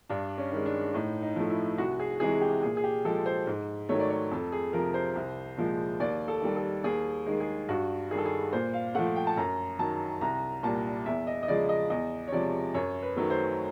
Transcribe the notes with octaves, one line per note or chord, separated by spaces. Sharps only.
G2 D4
C#4
D#3 G#3
D4
A2 D#4
D#4
F3 A3
E4
C2 F#4
G#4
C3 E3 G#3 G#4
G4
A#2 G#4
G#4
G4
F3 G#3 A4
C5
G#2
D#3 F#3 A3 C#5
D5
C#5
F2 A4
G#4
C3 F3 A#4
C5
C2
A#2 F3 G#3
D#2 D5
A4
D#3 G3
A4
D#2 G#4
D#3 G#3
G#4
G2 F#4
D#3 G3 G#4 A4
G#4
A#2 C5
F5
F3 A3 F#5
G5
A5
F#2 A#5
D#3 F#3 A5
C2 A#5
A#2 G3 A5
E2 E5
D#5
D#5
C#3 F3 G#3 D5
D#5
E2 D#5
C#5
C3 F3 G#3 D5
F#2 C#5
B4
D#3 F#3 A3
C5